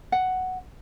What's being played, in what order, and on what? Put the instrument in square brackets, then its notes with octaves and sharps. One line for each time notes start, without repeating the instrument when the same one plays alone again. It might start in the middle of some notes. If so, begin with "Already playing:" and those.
[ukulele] F#5